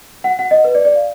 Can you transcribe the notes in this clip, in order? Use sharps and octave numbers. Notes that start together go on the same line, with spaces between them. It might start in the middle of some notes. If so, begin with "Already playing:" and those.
F#5
F#5
D#5
B4
D5
D5
F5